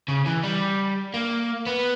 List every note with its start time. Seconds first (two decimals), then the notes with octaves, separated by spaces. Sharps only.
0.08 C#3
0.26 E3
0.43 G3
1.14 A#3
1.66 B3